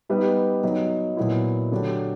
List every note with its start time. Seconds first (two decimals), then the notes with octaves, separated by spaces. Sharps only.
0.09 G3 B3 D#4 G4 B4
0.64 F#3 B3 D#4
1.17 A#2 F#3 B3 E4
1.72 D3 F#3 A3 D4 G4